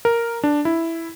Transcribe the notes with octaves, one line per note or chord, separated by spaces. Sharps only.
A#4
D4
E4